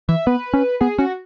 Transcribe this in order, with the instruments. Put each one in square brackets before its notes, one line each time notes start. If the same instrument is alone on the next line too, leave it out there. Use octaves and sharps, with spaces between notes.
[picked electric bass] E3 [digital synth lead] E5
[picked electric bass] B3 [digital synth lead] B4
[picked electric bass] C#4
[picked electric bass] B3 [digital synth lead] G#4
[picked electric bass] C#4 [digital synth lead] F#4